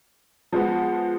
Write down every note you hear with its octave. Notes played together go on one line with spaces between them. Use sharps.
F3 G#3 B3 F#4